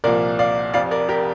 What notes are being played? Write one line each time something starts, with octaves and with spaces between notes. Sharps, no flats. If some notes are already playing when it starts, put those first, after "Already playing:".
C2 A#2 F3 A#4 D5
D5 F5
F1 F2 C3 D5 F5
A#4 D5
G4 A#4